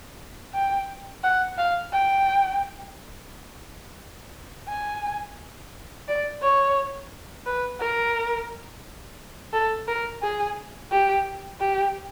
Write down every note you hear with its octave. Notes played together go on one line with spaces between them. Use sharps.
G5
F#5
F5
G5
G#5
D5
C#5
B4
A#4
A4
A#4
G#4
G4
G4